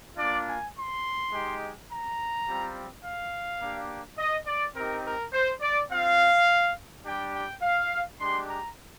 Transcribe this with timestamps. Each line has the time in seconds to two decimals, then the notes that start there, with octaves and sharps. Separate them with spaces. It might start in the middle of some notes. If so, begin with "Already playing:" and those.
0.17 A#3 D4 F4 D5
0.46 G#5
0.75 C6
1.32 G#3 D#4 G4
1.89 A#5
2.46 G3 C4 F4
3.03 F5
3.61 A#3 D4 G4
4.18 D#5
4.46 D5
4.75 C4 D#4 G4 A#4
5.05 A#4
5.33 C5
5.61 D5
5.89 C4 F4 F5
7.05 G3 D4 G4 G5
7.33 G5
7.62 F5
8.19 G#3 D4 G4 C6
8.47 A#5